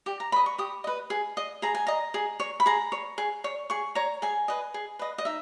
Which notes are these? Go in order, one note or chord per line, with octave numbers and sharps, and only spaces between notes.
G4 G5
A#5
B4 D#5 B5
C#6
G4 D#6
B4 D#5
G#4
D#5
G#4 A#5
G#5
D#5 A#5
G#4
C#5
B5
G#4 A#5
C#5
G#4
C#5
G#4 C#6
C#5 A#5
G#4 G#5
B4 D#5
G#4
B4 D#5
D#5
D#4 E5